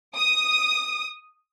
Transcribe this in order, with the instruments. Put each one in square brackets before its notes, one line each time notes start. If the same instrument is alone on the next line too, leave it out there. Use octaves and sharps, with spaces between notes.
[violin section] D#6